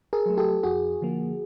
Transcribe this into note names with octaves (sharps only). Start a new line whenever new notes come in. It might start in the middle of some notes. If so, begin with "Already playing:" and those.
G#4 A#4
F#3 A3
G4 A4
F2 F#4 G#4
D3 F3 A#3